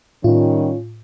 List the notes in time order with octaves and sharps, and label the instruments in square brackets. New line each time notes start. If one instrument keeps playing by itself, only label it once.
[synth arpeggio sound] A2 [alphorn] D#3 [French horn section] G3 C#4 [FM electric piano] F4